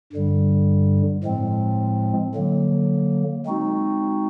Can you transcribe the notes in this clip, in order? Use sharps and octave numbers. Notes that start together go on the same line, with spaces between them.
G2 D3 G3
A2 F3 G#3 C4
D3 F#3 A#3
G#3 C4 D#4 F#4